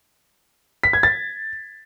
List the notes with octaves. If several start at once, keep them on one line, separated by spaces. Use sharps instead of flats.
B6
G#6
A6